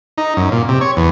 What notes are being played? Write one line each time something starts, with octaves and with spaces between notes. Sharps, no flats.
D#4
F#2
A#2
C3
C#5
E2